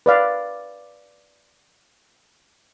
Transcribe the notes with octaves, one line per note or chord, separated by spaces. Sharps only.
B4 D5 F5